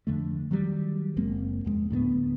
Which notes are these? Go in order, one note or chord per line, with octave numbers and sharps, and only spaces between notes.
F2 D3 A3
D#3 F#3 G3
F#1 G#3 A#3 C4
F1 E2 G#3
D2 A2 G3 B3